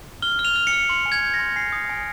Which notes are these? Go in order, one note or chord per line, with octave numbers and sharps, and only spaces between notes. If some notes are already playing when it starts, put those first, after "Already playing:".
F6 G7
F6
F7
F6
C#7
F6
C6
G#5
G#6
G6
A#6
C6
G#5 C7
D#6
G#5